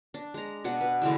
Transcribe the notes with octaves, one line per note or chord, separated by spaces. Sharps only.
D4
G#3 A#5
B2 D4 F#5
B4
D3 E3 G#3 E4